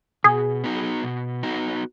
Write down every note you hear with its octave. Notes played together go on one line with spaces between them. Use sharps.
B2 G#4
B3 D#4 F#4
B2
B3 D#4 F#4